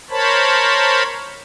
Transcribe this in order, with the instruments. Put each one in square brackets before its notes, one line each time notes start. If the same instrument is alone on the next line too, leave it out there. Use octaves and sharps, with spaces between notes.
[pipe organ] A#4 C5 C#5 A5 B5